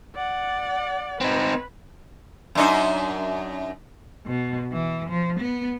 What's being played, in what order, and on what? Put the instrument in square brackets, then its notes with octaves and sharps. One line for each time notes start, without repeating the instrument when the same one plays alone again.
[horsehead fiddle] D5 F#5
[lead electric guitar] C4 D#4 [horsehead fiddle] B4
[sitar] F#2 D4 D#4
[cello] B2
E3
F3
B3